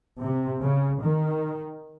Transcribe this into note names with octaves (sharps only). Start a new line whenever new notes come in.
C3
C#3
D#3